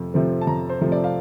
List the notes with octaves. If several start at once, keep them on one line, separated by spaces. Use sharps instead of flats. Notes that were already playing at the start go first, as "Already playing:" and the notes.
Already playing: F2 C3 A3
C3 F3 A3
A5
F2 A#5
C5
C3 F3 A3
D5
F5